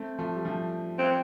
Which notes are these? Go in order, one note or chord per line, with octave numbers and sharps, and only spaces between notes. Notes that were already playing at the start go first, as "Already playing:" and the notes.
Already playing: A3 C4
F3 A3
G3
F3 A3
C4